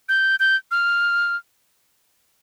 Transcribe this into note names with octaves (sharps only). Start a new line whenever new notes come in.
G6
G6
F6